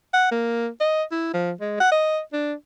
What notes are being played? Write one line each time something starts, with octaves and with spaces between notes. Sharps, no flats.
F#5
A#3
D#5
E4
F3
G#3
F#5
D#5
D4